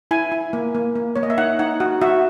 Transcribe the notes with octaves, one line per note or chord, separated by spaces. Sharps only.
E4 G#5
E4
A#3
A#3
A#3
A#3 C#5
D#5
E5
D#4 F#5
D#4 F#5
F#4
F#4 E5